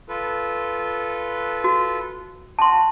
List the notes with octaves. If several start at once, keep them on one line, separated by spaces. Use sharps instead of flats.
F4 A4 B4
F#4
F#4 A5 C6